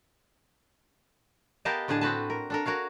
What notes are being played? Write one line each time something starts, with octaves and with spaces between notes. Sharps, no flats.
B3 G4 A#4 D#5 F5 A5
A2 D3 D4 G#4 A5
C4 F#4 B4 A5
A#4
D4 A4 A#4
F#4 A#4 C#5 F5